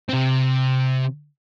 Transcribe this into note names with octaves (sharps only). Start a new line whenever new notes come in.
C3 C4